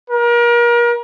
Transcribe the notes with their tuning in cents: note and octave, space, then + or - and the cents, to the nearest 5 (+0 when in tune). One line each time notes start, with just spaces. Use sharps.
A#4 +35